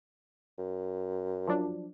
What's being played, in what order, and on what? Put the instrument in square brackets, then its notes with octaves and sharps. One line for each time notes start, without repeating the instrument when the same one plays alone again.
[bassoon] F#2
[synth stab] F3 F#3 D4